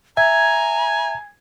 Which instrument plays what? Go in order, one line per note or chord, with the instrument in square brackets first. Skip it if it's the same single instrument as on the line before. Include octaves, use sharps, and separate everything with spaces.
[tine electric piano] E5 [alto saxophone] G#5 [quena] A#5 [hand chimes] G#6